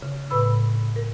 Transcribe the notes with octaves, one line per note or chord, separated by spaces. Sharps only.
C#3
A2 B4 B5 E6
A#4